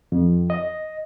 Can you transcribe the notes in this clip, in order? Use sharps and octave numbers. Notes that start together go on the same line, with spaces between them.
F2
D#5